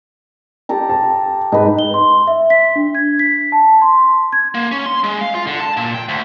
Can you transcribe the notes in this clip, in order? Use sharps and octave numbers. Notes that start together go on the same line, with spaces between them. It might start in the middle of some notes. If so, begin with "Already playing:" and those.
G4 A4 A#5
A5
G#2 D#4 B4
G7
C6
E5
B6
D4
G#6
B6
A5
C6
G#6
A#3
C#4
C6
G#3
F5
F4
D3
A5
A#2
G5
D2